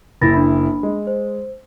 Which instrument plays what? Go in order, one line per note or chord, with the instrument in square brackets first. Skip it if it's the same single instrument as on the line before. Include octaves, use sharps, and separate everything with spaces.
[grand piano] F#1 E4 [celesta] B5 A6 A#6
[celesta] D4 B5
[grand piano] G#3
[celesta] C5